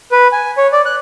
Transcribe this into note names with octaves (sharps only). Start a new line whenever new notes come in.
B4
G#5
C#5
D5
F#6